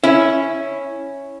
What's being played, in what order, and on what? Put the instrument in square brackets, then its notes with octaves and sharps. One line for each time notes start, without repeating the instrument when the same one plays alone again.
[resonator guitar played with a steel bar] C#4 [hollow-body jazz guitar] E4